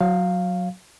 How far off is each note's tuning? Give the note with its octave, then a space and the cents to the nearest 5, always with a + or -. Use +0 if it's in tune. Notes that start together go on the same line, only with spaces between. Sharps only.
F#3 -10 F5 +0